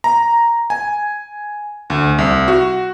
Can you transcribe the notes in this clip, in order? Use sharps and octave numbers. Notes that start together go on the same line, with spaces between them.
A#5
G#5
D2
C2
F#4